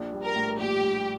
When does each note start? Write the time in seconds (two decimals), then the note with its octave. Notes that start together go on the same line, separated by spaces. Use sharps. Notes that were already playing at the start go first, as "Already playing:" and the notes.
Already playing: A#1 D4
0.12 G3
0.24 A#4
0.36 A2
0.58 A#1 G4
0.81 G3